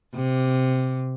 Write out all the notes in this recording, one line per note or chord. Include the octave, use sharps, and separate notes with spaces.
C3